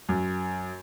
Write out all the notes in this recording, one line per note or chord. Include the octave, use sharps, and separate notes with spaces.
F#2